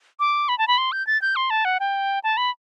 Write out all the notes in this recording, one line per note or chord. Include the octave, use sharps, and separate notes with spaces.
D6
B5
A5
B5
C6
G6
A6
G6
C6
A5
F#5
G5
A5
B5